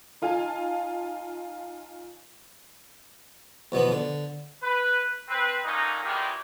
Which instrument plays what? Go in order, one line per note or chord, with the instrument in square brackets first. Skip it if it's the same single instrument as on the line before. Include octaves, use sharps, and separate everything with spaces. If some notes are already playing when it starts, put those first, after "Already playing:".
[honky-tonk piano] D#4 F4 F5 G#5 A5
[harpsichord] E2 B2 F3 B3
D3
[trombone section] B4
C4 B4
A#2 D3 C#4 D#4
E2 A#2 D#3 G3 G#3 G4